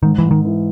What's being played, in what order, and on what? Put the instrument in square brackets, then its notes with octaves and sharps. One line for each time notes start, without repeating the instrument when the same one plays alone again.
[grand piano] G#2 [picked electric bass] D#3
[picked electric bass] E3
[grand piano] G#2
[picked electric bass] D#3
[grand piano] E3